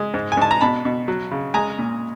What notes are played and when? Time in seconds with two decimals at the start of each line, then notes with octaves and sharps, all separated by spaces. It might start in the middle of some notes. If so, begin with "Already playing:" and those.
Already playing: G#3
0.14 G#2
0.32 G#5
0.37 G#2 A5
0.51 A#5
0.61 B2 A5 B5
0.85 B2
1.08 F#3
1.31 C#3
1.54 G#3 G#5 A#5
1.78 A#2